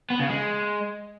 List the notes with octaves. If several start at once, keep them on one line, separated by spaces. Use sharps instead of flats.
B3
C#3
G#3